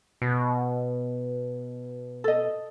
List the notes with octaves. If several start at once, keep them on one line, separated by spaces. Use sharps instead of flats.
B2
A4 D#5